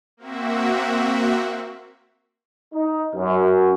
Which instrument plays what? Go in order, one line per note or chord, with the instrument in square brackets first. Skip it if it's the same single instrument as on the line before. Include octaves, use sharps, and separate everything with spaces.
[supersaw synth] A#3 C4 F#4 E5
[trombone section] D#4
F#2